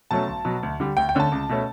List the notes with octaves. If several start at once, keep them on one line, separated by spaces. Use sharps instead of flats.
B2 F#3 A3 C#4 A5
B1
B2 F#3
D2
D3 G3
D2 G5
G5
D3 A3 C#4 A5
C#2
B2 A3 C#4